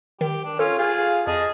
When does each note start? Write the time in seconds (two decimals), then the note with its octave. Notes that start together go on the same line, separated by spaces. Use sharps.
0.21 D#3 G4
0.45 D4
0.59 C#4 F4 A4
0.78 F4 G#4 F5
1.27 F2 G#4 D#5 A5 D#6